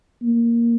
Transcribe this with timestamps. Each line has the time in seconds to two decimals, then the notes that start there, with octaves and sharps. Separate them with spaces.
0.23 A#3